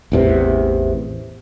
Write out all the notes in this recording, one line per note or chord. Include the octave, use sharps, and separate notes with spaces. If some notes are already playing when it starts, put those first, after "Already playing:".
A1 E2 C3